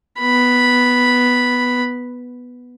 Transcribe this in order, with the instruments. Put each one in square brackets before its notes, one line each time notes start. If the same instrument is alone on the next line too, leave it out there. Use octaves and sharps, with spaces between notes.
[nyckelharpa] B3 B5